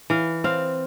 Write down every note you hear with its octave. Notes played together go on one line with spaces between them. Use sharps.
E3 F5
C4 F5